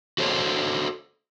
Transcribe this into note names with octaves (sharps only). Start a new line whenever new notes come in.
F#4 A4 C5 C#5